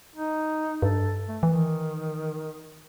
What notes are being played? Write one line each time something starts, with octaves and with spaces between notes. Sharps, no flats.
D#4
G2 A4
A3
D#3 E3